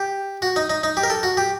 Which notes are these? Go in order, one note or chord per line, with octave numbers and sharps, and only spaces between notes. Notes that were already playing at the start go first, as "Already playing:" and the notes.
Already playing: G4
F#4
D#4
D#4
D#4
G4
A#4
A4
F#4
G4